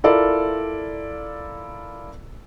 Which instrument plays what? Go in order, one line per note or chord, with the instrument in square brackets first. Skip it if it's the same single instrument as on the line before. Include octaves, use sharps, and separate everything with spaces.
[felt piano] E4 F4 A4 A#4 D5